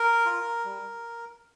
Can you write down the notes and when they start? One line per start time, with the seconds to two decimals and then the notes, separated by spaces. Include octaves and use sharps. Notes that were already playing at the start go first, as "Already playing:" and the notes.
Already playing: A#4
0.26 F4
0.65 G3